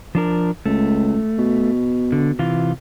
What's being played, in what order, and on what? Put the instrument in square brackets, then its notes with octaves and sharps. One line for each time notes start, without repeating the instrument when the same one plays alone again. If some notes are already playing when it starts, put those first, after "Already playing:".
[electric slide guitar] F3 D4 A#4
[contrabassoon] C#2 [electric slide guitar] A3
[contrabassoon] B2
[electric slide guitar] D3
C3 E3 F4